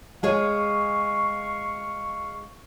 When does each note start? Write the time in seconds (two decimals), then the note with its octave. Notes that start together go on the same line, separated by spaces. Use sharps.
0.23 G#3 G#4 C#5 F5 C#6